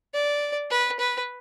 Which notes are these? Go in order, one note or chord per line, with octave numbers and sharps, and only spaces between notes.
D5
B4
B4